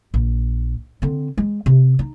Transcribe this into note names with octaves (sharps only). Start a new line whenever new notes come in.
A#1
D3 C4
G#3
C3
D#4